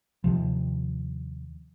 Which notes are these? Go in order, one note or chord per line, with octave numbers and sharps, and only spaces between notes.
D#2 C3 F3